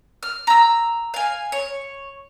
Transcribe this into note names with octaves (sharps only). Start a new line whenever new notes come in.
F6
A#5 E6
F5 G#5
C#5